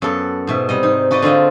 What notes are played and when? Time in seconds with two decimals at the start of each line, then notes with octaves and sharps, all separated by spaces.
0.02 F#2 B3 A4 F#5
0.47 G#2 B2 E5
0.69 C3 G3 D#5
0.83 G#2 D#4
1.11 D#4 F#4 B4 D5 D#5
1.22 D3 C4 F4 D#5